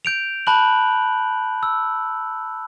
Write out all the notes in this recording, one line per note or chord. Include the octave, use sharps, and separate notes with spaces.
G6 D7 F7
A5 B5 F#6 F#7
E6